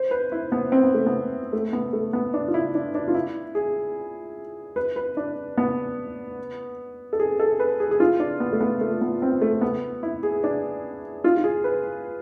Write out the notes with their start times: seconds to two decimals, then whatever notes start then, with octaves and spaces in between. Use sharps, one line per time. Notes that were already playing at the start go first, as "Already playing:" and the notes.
Already playing: C5
0.11 B4
0.32 E4
0.52 B3
0.72 C4
0.83 B3
0.94 A3
1.06 B3
1.53 A3
1.73 B3
1.93 A3
2.13 B3
2.34 D4
2.48 F4
2.54 E4
2.75 D4
2.95 D4
3.08 F4
3.15 E4
3.55 G#4
4.76 B4
4.96 B4
5.17 D4
5.57 B3
7.13 A4
7.20 G#4
7.40 A4
7.60 B4
7.80 G#4
7.91 G#4
8.00 F4
8.20 D4
8.40 B3
8.53 A3
8.60 B3
8.81 A3
9.01 B3
9.22 C4
9.42 A3
9.61 B3
10.03 E4
10.23 G#4
10.44 D4
11.24 F4
11.37 F4
11.44 G#4
11.64 B4